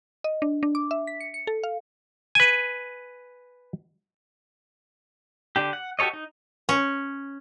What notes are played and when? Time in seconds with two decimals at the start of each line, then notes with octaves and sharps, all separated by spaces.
0.24 D#5
0.42 D4
0.63 D4
0.75 D6
0.91 E5
1.07 B6
1.20 C#7
1.34 C#7
1.47 A4
1.63 F5
2.35 B4 G#5
5.56 D3 D4 G4
5.73 F#5
5.99 F#4 G4 A4 C#5 D#5
6.13 D#4
6.69 C#4